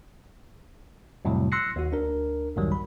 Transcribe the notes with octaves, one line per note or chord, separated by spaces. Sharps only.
F2 A2 C3 F#3 G3
C6 E6 F#6 A#6 C7 C#7
D#2 F#4
D2 D4 A#4
C2 F2 G#2 D#3 F#3 G3
B5